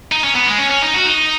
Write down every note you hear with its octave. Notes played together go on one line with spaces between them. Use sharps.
D#4
C#4
B3
G#3
C#4
C#4
D#4
F#4
D#4